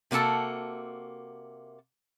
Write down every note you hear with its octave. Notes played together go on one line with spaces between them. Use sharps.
C3 A#3 F#4 A4 A5